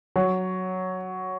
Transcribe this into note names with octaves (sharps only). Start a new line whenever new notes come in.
F#3